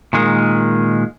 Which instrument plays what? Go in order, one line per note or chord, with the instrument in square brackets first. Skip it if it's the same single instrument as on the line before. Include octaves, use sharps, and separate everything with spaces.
[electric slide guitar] A#2 D#3 G#3